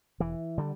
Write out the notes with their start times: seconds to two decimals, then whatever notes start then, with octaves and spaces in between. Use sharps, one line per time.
0.20 E1 E3
0.58 D3 G3